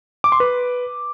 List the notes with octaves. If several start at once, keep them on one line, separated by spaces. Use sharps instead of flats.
D6
C6
B4